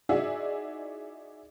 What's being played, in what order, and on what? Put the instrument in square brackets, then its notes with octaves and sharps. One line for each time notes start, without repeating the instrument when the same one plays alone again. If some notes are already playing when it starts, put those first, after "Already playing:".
[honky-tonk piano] D#4 E4 F#4 G#4 D5 E5